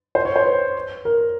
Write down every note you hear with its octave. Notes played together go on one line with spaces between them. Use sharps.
C5
C#5
C5
B4
A#4